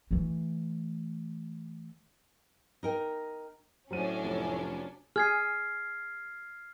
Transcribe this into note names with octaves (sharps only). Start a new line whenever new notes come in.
E3 A3
D#4 A#4 G5
A2 F#3 C#4 D4 C5 D#7
F1
G#4 F6 G#6 C7